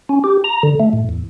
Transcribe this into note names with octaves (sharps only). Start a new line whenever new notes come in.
C#4
G4
A#5
D3
A3
A2
E2